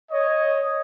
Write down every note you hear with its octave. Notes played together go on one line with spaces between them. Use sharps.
C#5 D#5